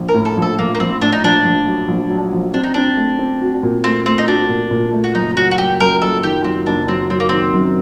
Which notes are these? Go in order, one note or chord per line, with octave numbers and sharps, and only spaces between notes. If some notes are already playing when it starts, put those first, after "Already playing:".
Already playing: A#1
A#4
A2
A4
A#1
A4
A#1 A#3
A#3
A#1 C4
A2 D4
D#4
A#1 D4
A#1
F#3
A#1
F#3
A#1
C4 D4
D#4
C4 D4
A3
C4
F#4
A#2
A3 C4
A3 C4
D#4
D4 F#4
A#2
A#2
A3
F#4
F#1 D#4
F#3 F#4
F#4
F#1 G4
F#2 A#4
F#1 A4
D#3 G4
F#3 C4
F#1 D4
F#3 C4
F#3 C4
A#3
D#3 C4
F#2